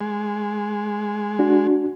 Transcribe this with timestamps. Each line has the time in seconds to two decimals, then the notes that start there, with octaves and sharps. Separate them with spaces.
0.01 G#3
1.39 D4 F#4